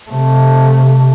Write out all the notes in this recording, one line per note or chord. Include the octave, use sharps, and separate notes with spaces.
C3 A3